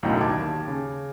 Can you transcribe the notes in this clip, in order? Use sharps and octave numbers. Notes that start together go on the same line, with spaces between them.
B1 F#2 A2 D3 D#4 G5
D#2 A5 D6 G#6
C#3